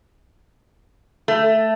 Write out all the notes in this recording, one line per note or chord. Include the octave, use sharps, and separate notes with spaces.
A3